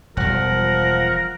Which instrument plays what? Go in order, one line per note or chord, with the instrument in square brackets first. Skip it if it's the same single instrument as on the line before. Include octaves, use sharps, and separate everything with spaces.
[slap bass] E1 G3 [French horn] F3 [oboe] A#4 [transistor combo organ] F#5